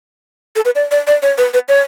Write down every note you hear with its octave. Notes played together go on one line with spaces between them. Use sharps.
A4
B4
D5
D5
D5
C#5
B4
B4
C#5